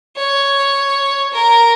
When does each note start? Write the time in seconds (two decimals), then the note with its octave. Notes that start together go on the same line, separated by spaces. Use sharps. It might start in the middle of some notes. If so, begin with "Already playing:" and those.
0.16 C#5
1.33 A#4